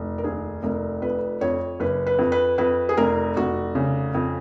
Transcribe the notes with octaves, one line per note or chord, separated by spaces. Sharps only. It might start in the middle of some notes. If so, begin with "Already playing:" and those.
Already playing: F1
A#4
D#2 G#4
F1 A#4
F2 B4
F2 C#5
F#1 B4
B4
F2
B4
F2 B4
G#4
F1 A#4
F1 F#4
C#3
F2